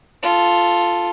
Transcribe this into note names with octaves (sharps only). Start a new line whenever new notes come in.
F4 A4